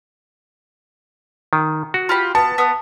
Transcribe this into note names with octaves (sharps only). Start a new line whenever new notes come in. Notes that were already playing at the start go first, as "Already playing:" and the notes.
D#3
F#4
F4 G4 B5
B3 A5
B3 D#6